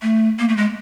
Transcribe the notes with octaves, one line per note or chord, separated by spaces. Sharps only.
A3
A#3
A3
G#3